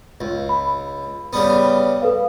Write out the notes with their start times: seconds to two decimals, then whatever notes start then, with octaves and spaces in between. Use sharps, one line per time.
0.21 C#2
0.49 B5
1.33 C#3 G3 B3
2.02 A4 B4 F5